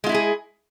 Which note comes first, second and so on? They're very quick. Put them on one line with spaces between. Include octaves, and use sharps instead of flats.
G#3 F4 E4 G4 G#4